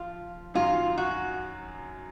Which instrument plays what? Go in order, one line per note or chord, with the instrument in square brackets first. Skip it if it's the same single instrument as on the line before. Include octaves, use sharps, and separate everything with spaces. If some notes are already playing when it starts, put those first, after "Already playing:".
Already playing: [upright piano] F3 [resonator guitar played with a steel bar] F4
[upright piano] F#2 D#3 F#3 [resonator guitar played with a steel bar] F4
[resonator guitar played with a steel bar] F#4